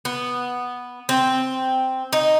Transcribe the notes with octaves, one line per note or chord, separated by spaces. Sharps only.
B3
C4
D#4